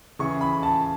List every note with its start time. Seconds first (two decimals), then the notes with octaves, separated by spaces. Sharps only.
0.19 C#3 E3 C#6
0.41 B5
0.63 A5